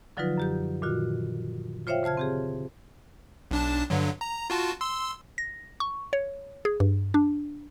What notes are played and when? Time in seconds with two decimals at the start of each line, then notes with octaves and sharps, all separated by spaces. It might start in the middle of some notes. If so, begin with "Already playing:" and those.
0.17 D3 F3 F#3 D#4 F4 B4
0.38 F#2 G4 G6
0.82 A#2 D#3 F4 F#4
1.87 F4 C5 C#5 E5 F5 G5
2.03 C#3 C5 A5 F6 G#6
2.17 C4 G4 G#4
3.51 B1 D4 A5
3.90 G2 D3 F#3
4.21 A#5
4.50 F4 F#4 A5
4.81 C6 E6
5.38 A#6
5.80 C#6
6.13 C#5
6.65 G#4
6.80 G2
7.14 D4